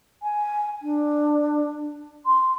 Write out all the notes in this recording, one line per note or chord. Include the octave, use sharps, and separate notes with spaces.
G#5
D4
C6